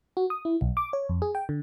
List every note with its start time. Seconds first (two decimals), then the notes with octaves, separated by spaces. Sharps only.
0.17 F#4
0.30 D#6
0.45 E4
0.61 B1
0.77 D6
0.93 C#5
1.09 F2
1.22 G#4
1.35 G5
1.49 D3